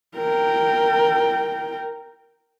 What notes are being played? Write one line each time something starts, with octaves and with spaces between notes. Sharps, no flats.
A#4 G5